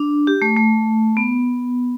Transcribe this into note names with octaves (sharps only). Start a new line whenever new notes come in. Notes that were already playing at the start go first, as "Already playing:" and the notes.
Already playing: D4
G4
A3
A3
B3